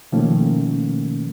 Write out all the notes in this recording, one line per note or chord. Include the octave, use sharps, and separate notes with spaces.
B2 D#3 F3 A3 A#3 C#4